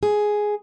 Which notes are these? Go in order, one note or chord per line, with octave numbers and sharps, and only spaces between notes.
G#4